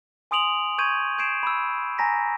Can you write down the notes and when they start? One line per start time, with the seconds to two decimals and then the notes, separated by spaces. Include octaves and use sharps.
0.31 G#5 C6 D#6 D7 F7 F#7
0.78 C#6 G6 G#6 D#7
1.18 G6 G#6 C7 D7 E7
1.43 B5 E6
1.98 G#5 A#5 A#6 B6